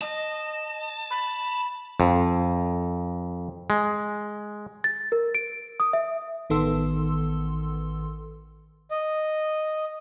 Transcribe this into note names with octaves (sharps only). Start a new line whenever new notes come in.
D#5 A5
B5
F2
G#3
A6
A#4
D7
D#6
E5
A1 D#3 B3 A4 C6 E6
D#5